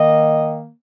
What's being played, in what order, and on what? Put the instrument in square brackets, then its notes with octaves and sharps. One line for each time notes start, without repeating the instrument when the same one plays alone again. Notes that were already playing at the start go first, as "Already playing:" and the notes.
Already playing: [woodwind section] D#3 A#3 D#5